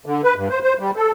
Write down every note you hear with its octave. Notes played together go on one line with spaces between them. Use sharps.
D3
B4
G2
C5
C5
G3
A4